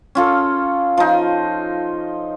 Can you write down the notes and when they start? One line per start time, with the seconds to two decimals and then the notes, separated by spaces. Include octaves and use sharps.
0.15 C#4 F4 A4
0.97 F3 D#4